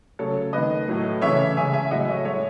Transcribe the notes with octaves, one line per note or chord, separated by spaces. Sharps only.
C#3 F#3 A3 A4 C#5
D#3 A3 B4 D#5
A2 F#3 A3
C#3 E3 A3 C#5 E5
C#3 G#3 E5 G#5
E5 G#5
A2 F#3 A3 D#5 F#5
C#5 E5
A2 G#3 C#5 E5